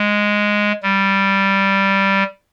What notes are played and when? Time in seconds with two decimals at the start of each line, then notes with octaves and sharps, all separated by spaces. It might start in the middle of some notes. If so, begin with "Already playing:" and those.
Already playing: G#3
0.83 G3